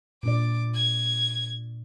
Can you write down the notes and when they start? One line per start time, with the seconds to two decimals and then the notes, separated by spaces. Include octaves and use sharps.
0.23 A#2 D4 D5 D6
0.74 G#6